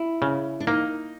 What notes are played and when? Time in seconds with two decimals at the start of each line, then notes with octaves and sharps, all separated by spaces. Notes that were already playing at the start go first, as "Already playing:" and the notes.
Already playing: E4
0.22 C#3
0.60 D4
0.67 A#3 D#4